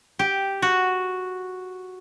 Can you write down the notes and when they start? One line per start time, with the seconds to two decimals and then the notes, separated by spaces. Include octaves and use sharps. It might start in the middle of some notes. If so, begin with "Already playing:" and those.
0.19 G4
0.62 F#4